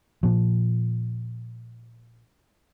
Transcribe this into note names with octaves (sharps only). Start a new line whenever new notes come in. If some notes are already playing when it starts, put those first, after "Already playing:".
A#2 F3